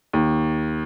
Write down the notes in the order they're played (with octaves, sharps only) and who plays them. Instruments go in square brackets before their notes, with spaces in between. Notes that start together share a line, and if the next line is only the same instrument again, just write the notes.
[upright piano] D#2